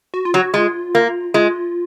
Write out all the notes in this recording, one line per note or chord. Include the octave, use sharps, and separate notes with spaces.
F#4
F4
F#3 F#4
G#3 F4
A#3
G#3 F4